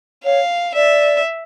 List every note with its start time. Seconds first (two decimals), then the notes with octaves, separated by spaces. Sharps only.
0.25 C#5 F5
0.75 D5 E5